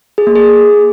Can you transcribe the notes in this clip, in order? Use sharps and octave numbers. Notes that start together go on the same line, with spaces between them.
G#4
A#3
G#4